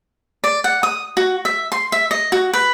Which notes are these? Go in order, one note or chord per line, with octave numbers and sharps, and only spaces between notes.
D5
F#5
D#6
F#4
E5
C6
E5
D#5
F#4
B4